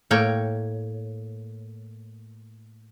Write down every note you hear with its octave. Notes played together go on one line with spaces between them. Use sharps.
A2 A#3 C#5 G5